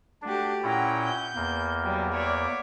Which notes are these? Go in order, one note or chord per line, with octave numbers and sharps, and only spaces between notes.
A3 D4 F#4 G4
A#2 C#4 E4 F#5 G5 A#5
G6
E2 A#3
F#3 G3
C#5 D5 E5